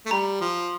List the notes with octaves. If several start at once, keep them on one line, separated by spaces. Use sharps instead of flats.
A3
G3 A#5
F3